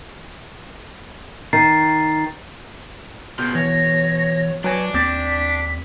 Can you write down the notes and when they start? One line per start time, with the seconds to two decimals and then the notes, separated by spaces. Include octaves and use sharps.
1.53 D#3 A#5 A6 C7
3.39 B2 F4 G#4 A#4 G6
3.55 E3 C#5 A#6
4.64 F#3 D4 F#4 B4 G#5
4.94 D#2 C4 D5 B6